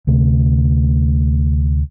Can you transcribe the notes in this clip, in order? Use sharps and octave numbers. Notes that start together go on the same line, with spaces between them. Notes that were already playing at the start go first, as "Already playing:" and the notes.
D2 C3 A3